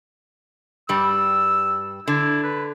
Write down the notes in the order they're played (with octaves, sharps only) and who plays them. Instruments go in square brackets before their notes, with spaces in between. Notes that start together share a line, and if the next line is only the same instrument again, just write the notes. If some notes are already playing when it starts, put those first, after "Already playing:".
[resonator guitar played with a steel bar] G2 G3 [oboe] E6
[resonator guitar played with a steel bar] D3 [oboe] E4
[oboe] B4